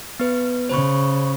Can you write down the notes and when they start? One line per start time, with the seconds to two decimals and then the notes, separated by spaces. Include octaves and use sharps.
0.19 B3 B4
0.69 C#3 C5 B5 C#6